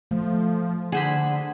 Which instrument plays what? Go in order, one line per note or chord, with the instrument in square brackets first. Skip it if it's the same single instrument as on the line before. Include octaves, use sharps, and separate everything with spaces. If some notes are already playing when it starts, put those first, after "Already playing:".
[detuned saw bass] F3 [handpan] A3
[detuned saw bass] D3 [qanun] G#4 C5 B5 [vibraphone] F#5